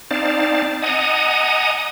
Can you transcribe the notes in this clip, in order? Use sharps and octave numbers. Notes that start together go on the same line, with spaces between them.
C4 D#4 D5 F5 A5
D#5 F#5 G#5 A#5 D#6